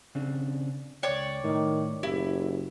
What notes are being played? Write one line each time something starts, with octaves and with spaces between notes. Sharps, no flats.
C#3 C4 D4
C#2 C#5 D5 G5
A2 D#3
F#1 E4 G4